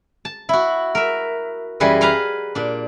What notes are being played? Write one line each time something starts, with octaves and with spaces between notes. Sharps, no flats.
A5
E4 F#4
A#4 E5
F#2 E3 G3 G#4 B4 D#5
B4 F5 G#5 A#5 C6
A#2 D4